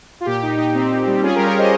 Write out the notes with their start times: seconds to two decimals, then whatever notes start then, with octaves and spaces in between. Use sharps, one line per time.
0.21 F4
0.26 A#2 G4
0.42 D#4
0.57 D#4
0.74 C4
0.90 D#4
1.07 G3
1.22 C#4 F4 G#4
1.35 G4 A#4
1.38 G3
1.46 A#4 C#5
1.54 C#4 C5 D#5